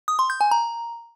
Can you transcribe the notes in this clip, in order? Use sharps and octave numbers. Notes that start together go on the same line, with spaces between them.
D#6
C6
G6
G#5
A#5